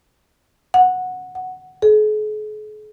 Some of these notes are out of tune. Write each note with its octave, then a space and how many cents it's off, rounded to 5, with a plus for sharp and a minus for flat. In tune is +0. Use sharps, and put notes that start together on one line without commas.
F#5 -10
F#5 +5
G#4 +45